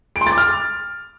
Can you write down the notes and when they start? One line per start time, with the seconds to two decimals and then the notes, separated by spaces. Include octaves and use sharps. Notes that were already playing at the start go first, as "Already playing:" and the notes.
0.16 D7
0.21 C6
0.27 A6
0.32 D6
0.38 F6